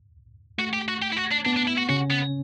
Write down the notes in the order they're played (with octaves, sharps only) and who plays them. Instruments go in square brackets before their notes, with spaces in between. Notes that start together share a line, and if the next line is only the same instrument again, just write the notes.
[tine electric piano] A3 [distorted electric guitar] F#4
[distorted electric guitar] G4
F#4
G4
E4
F#4
D4
[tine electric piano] B3 [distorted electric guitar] D4
[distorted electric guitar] D4
E4
F#4
[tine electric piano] C#3 C#4 [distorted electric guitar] F#4
[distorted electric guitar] B3